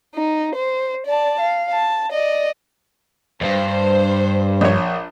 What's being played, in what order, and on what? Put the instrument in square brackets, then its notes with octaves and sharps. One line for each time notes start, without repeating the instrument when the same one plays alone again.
[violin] D#4
C5
D5 A5
F5
A5
D5 D#5
[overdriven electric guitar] E2 G2 [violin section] C5
[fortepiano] A#1 C#5